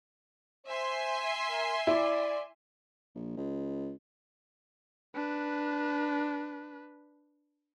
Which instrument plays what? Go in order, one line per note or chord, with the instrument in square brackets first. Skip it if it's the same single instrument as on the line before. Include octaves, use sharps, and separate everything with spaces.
[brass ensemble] C5 [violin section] E5 G#5 C6
[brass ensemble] A#4
[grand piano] E4 [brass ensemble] D5
[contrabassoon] A#1
C#2
[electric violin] D4 B4